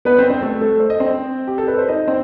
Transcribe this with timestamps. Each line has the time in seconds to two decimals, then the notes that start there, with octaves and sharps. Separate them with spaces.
0.05 B3 B4
0.18 C4 C5
0.30 C4 C5
0.42 A3 A4
0.61 A3 A4
0.80 C5
0.90 D#5
1.00 C4 C5
1.47 G4
1.58 A4
1.68 B4
1.78 C5
1.89 D#4 D#5
2.07 C4 C5